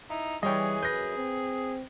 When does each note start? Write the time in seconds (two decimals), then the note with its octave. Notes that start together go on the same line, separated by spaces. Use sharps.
0.10 D#4 E4
0.43 E3 G3 G#4 C#5 D#5 G5
0.83 F#2 B4 G6 A#6
1.17 C4